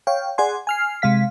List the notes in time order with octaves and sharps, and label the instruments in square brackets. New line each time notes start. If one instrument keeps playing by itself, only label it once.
[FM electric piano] C#5 F5 G5
G#4 D5 F#5 G#5 C6
G#5 F6 C7
C3 G#3 F5 B6